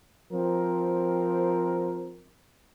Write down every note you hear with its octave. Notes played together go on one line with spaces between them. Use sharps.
F3 C4 A#4